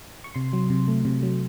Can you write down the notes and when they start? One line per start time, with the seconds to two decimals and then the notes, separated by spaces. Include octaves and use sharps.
0.24 C#6
0.35 C3 C6
0.53 F#3
0.70 C3
0.88 A3
1.05 C3
1.23 F#3